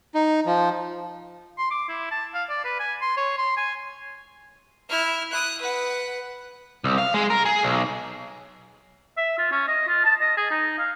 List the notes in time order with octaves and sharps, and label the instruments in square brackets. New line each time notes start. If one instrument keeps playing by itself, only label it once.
[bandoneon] D#4
F3
[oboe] C6
D6
E4
A5
F5
D5
B4
G#5
C6
C#5
C6
G#5
[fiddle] E4 F6
D#6 F#6
B4 F#5
[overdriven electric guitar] C2
F5
G#3
A#4
G#4
B1
[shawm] E5
F4
C#4
D#5
F4
A5
D#5
G#4
D#4
F5